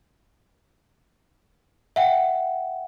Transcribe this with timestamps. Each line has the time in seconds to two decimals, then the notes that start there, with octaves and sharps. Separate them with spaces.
1.96 E5 F#5 G5